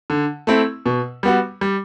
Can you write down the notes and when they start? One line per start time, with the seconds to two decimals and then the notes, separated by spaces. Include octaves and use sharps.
0.10 D3
0.47 A3 C4 E4
0.86 B2
1.23 G3 B3 F#4
1.61 G3